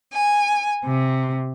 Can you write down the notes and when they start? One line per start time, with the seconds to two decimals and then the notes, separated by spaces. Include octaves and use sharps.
0.13 G#5
0.85 C3